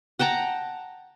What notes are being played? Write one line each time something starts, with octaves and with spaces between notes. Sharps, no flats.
F#5 G5 A5 A#5